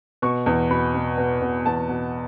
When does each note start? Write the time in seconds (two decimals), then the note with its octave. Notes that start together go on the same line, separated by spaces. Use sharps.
0.22 B2 C#6
0.46 E2
0.70 B2 B5
0.94 B2
1.17 B2
1.42 B2
1.66 E2 A5
1.89 B2